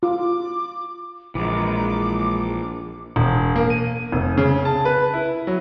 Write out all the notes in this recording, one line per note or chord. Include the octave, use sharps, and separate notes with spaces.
F4 D6
A#1 E3 G#3 D6
E1
A#3
D#7
F1
C#3
A5
B4
E4
F#3